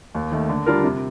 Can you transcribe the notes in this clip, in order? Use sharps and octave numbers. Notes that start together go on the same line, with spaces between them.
D#2
D#3 A3
D3
G3 D4 F4 A#4
C3